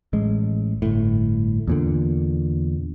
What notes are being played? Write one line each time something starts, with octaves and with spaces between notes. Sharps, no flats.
A1 G#3
G1 A2
E2 A#2 D3